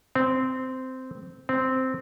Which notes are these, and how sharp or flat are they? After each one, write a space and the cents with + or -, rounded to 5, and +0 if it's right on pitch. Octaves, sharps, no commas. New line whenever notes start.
C4 -15
C4 -10